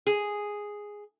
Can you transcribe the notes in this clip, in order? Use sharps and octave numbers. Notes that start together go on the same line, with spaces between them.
G#4